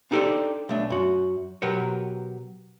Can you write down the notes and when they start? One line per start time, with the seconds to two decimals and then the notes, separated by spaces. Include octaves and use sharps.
0.11 D4 D#4 G4 A4 C5 D5
0.69 B1 A3 D4
0.90 F#2 F#4
1.62 B2 F#3 G4 A#4 B4 C#5